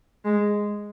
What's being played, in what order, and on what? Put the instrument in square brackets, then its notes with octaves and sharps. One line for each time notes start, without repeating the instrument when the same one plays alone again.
[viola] G#3